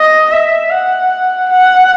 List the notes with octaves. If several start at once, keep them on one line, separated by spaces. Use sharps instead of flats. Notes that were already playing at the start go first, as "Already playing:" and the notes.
Already playing: D#5
E5
F#5
F#5